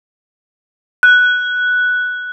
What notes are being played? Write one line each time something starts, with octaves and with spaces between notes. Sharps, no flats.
F#6